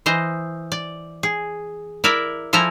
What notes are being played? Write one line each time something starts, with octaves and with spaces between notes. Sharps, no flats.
E3 C5 D#5
D5
G#4
E4 A#4 D5 E5
F3 E4 A4 G#5 A#5